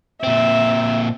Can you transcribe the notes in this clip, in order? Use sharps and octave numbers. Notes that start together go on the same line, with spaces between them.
A#2 C4 E5